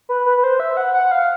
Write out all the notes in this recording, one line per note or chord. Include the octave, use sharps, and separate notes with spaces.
B4
B4
B4
C5
E5
F#5
F#5
F5